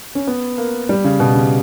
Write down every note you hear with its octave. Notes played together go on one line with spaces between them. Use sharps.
C#4
B3
A#3
G3
C#3
B2
C#3